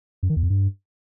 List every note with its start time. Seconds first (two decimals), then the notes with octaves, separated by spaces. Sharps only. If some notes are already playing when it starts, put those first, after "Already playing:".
0.23 F#2
0.30 D#3
0.36 E2
0.43 F2
0.50 G2